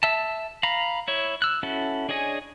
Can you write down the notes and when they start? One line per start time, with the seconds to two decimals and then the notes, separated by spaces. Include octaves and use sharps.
0.03 E5 A5
0.63 F5 A#5 B5
1.08 E4 C#5
1.42 E6 F#6
1.63 C#4 E4 F#4 A4
2.09 D4 G#4 C#5 D#5 G#5